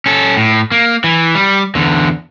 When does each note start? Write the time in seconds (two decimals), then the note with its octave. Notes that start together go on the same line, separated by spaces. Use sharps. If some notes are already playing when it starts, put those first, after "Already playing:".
0.06 C#4 A4
0.37 A2
0.72 A#3
1.04 E3
1.35 G3
1.75 E2 D3